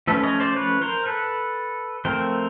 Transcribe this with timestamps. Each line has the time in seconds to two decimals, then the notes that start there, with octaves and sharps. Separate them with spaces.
0.07 F3 A3 C#4 A4 B4
0.23 C#5 D#5
0.40 C5 D5
0.56 B4 C#5
0.81 A#4 C5
1.06 A4 B4
2.05 F3 A3 C4 A#4 C5